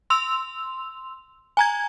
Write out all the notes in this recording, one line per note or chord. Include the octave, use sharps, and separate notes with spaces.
C6 E6 F7
G#5 A#5 G#6